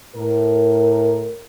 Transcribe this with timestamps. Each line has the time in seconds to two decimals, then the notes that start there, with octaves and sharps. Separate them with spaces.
0.16 A2 A#4